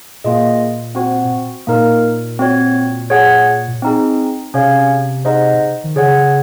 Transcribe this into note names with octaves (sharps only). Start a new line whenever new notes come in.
A#2 A#3 F4 G#4 D#5
C4 F#4 C5 F#5
A#2 A#3 D#4 A#4
C4 F#4 C#5
G#4 C#5 F#5
C4 D#4 G#4
C3 C#4 G#4 C#5 F5
D#4 G#4 C5 D#5 F#5
D#3
C#3 G#4 C#5 F#5